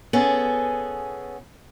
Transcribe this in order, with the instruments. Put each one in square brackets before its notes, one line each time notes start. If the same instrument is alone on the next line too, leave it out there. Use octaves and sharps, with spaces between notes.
[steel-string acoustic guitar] B3 C#4 G#4 A4